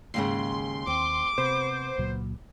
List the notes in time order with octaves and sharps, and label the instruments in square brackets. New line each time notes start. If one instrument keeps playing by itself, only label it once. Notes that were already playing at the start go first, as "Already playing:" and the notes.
[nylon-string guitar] D#2 G#2 C#3 [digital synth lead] C6
[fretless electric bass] D#2 [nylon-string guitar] C4 [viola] D6
[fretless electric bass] C3 [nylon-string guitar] B3 [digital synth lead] C5
[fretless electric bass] C#2 A#2 F#3